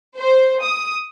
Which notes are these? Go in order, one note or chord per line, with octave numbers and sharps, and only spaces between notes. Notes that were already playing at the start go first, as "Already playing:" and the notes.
C5
D#6